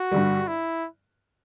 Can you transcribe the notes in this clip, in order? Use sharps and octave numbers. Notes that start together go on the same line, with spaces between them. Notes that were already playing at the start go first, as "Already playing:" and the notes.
Already playing: F#4
G2 D3 G3
E4